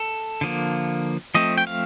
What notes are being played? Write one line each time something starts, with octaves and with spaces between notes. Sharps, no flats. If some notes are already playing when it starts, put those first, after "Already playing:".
Already playing: A4
D3 F3 A#3
F3 A3 C4 D#5
G5
F5